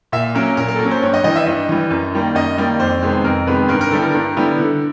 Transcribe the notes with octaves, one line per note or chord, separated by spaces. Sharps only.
A#2 E5
F#3 A#3 C#4 A#4
A#2 A#4
A#4
A4
F#3 A#3 C#4 A#4
C5
G2 C#5
D#5
E3 G3 D#5
E5
G2 D#5
E3 G3
F#2
D#3 G3 A#3
F#2 D#5
D#3 G3 A#3 D5
F2 C5
C3 D#3 G#3 B3
F2 A#4
C3 D#3 G#3 B3 B4
G2 A#4
A#4
D3 G3 B3 E4 A4
A#4
G2
D3 G3 B3 E4
D3